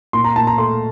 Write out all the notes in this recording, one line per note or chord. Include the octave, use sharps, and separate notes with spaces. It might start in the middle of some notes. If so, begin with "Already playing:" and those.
A#2 C6
A#5
A#2 A5
A#5
A3 C6